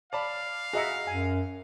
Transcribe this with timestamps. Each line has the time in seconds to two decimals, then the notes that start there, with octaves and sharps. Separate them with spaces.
0.13 D5 F5 A5 B5
0.73 F#4 G#4 D#5 E5 A#5 C#7
1.07 F#2 G#5